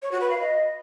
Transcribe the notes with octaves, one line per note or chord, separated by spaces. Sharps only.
C#5
F#4
B4
F5
D#5